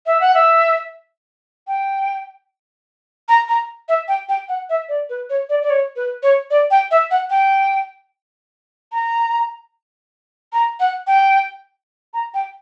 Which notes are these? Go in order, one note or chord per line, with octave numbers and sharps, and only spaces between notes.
E5
F#5
E5
G5
A#5
A#5
E5
G5
G5
F#5
E5
D5
B4
C#5
D5
D5
C#5
B4
C#5
D5
G5
E5
F#5
G5
A#5
A#5
F#5
G5
A#5
G5